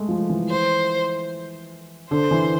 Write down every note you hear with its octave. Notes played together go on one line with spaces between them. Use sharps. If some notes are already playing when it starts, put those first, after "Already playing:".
Already playing: G#3 A3
F3
E3
C5
D3 C5
E3